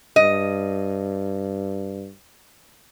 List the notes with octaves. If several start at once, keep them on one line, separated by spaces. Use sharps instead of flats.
G2 D#5